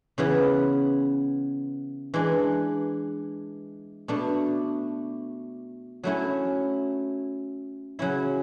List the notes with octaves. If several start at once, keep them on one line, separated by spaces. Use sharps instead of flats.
C#3 E3 B3 E4
E3 G#3 D4
B2 A3 D4
F#3 A3 C#4 E4
C#3 F#3 C#4 E4